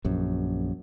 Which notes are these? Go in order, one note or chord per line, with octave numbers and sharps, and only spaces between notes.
A#1 F#2